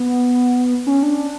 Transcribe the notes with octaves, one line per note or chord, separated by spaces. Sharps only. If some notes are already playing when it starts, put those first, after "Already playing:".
Already playing: B3
C#4
D4